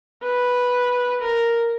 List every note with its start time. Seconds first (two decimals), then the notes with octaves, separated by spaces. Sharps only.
0.23 B4
1.22 A#4